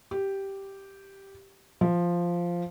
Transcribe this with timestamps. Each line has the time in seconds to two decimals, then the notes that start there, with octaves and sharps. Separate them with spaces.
0.11 G4
1.81 F3